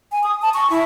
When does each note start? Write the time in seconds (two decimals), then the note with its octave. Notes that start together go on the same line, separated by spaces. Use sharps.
0.12 G#5
0.24 D#6
0.42 A5
0.54 C#6
0.70 E4